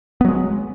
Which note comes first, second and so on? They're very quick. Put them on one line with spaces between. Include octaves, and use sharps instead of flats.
B3 F#3 G#3